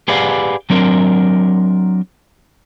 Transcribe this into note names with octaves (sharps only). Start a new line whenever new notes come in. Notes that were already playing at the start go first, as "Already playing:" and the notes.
G4 G#4 B4 D5 F5 F#5
F#3 C4 D4 A#4